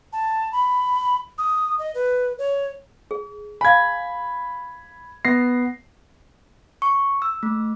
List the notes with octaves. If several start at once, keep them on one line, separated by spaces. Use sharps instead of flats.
A5
B5
D#6
D#5
B4
C#5
G#4
F5 G#5 B5 G#6
B3 A#6 C7
C#6
E6
A3